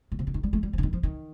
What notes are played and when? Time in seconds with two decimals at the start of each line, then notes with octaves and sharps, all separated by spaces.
0.12 A#2
0.19 C3
0.27 D3
0.34 D#3
0.43 G3
0.53 A3
0.63 G3
0.73 F3
0.78 D3
0.83 D#3
0.93 F3
1.03 D#3